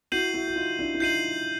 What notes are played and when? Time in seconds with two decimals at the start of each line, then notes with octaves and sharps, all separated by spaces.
0.12 E4 F#4 G6 C7 D#7 F#7
0.34 E4 F#4
0.47 F#4
0.56 D#4 F4
0.79 D4 E4
0.94 E4
1.00 D#4 F4 G6 C7 D#7 F#7